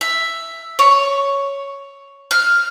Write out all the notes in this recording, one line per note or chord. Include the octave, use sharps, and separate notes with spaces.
E5
C#5
F6